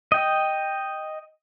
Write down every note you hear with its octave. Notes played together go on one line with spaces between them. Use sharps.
D#5 G5